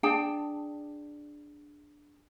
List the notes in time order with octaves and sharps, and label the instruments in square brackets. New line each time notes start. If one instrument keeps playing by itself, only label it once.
[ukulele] D4 G#4 G5 A5